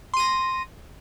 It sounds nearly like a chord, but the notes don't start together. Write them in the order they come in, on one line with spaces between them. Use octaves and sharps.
C6 D#7 A#6